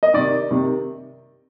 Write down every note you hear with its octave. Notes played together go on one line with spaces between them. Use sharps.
D#5
C3 D#3 D5
C3 D#3